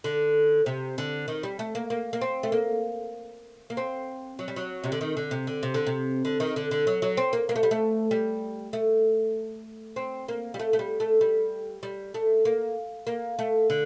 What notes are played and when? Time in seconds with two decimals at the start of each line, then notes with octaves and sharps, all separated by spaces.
0.04 D3
0.66 C3
0.98 D3
1.28 D#3
1.43 G3
1.59 A3
1.75 A#3
1.90 A#3
2.13 A#3
2.21 C4
2.43 A3
2.52 A#3
3.70 A#3
3.77 C4
4.39 F#3
4.48 G3
4.56 F#3
4.84 C3
4.92 D3
5.01 D#3
5.17 D3
5.31 C3
5.47 D3
5.63 C3
5.74 D3
5.87 C3
6.25 D3
6.40 D#3
6.56 D3
6.71 D3
6.87 F#3
7.02 F#3
7.17 C4
7.33 A#3
7.49 A#3
7.56 A3
7.63 G3
7.71 A3
8.11 G3
8.73 A3
9.96 C4
10.28 A#3
10.54 G3
10.59 A3
10.73 A3
10.79 G3
11.00 A3
11.21 G3
11.83 G3
12.14 A3
12.45 A#3
13.07 A#3
13.39 A3
13.70 D3